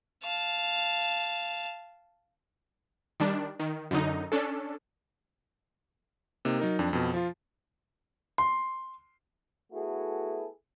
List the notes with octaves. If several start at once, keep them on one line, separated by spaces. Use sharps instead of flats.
F5 A5
D#3 G3 D4
D#3
F#2 D3 D#4
C#4 D4 A4
C3 A#3 D#4
F#3 D#4 A#4
F2 D4
F2 B2
F3 F4
C6
A3 B3 E4 F#4 G#4 A4